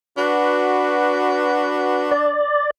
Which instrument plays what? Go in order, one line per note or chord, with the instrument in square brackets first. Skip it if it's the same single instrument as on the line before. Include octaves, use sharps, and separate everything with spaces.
[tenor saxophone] D4 [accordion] F#4 B4
[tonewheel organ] D5